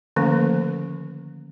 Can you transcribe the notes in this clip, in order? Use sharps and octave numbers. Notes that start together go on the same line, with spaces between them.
D3 D#3 F3 A3 A#3 C#4